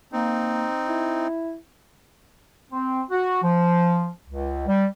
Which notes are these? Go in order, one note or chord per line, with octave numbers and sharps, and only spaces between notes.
A#3 C4 D#4
E4
C4
F#4
F3
C#2
G3